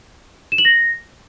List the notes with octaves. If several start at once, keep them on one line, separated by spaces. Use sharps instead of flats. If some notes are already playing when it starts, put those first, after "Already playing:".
E7
F#7
A#6